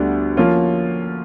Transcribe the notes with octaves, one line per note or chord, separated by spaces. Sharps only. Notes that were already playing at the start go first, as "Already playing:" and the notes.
Already playing: D2 D3 G3 B3 D4
F3 A#3 C#4 F4